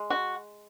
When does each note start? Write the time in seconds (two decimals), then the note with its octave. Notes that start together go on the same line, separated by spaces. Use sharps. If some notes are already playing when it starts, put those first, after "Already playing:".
Already playing: G#3
0.10 F#4